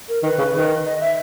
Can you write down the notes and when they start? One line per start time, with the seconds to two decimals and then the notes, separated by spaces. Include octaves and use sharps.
0.09 A#4
0.23 D#3 B4
0.38 C#3
0.54 D#3
0.85 D#5
1.00 E5